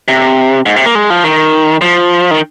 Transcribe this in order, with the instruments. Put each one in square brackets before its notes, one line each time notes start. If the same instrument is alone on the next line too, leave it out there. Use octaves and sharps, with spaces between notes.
[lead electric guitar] C3
G#2
C3
A#3
G#3
F3
D#3
F3
D#3